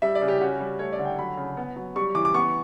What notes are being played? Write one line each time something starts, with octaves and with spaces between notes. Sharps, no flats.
G3 E5
D5
C#3
G4
C#4 F#4
G3
A3 C#5
D5
D3
G5
F#3 B5
C#3
B3
F#3
G3 C#6
E3 D6
D6
B3 C#6